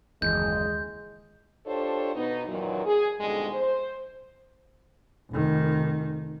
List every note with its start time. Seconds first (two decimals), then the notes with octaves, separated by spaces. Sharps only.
0.22 F#1 D#2 E3 G#3 G6
1.66 D4 F4 G4 A4 C5 C#5
2.14 B2 B3 D#4
2.47 F#2 A#2 D#3 E3 F#3
2.86 G#4
3.20 F2 G#2 B2 D3 G3 G#3
3.54 C5
5.30 F1 D#3